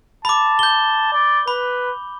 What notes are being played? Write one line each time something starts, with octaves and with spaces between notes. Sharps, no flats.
A5 B5 D6
G6 G7
D5
B4 B5